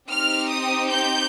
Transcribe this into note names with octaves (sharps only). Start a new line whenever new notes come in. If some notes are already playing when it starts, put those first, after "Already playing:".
C4 D#4 G4 F6
D#6
G6